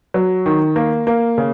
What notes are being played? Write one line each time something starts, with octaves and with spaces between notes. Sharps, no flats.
F#3
D#3
A#3
A#3
C#3